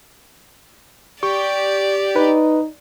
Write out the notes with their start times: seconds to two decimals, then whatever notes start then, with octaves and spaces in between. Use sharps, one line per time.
1.23 G4 D5 C#6
2.16 D#4 B4